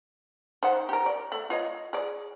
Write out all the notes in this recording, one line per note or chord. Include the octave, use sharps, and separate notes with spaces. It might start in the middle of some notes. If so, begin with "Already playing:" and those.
D#3 C5 F#5
G4 A#4
D5
A3
F4 C#5 D#5
G#4 D5